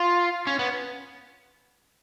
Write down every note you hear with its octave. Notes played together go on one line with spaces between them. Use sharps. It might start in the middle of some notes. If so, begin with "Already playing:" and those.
Already playing: F4
C#4
B3